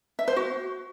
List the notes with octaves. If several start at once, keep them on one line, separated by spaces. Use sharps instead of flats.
E5
C5
F#4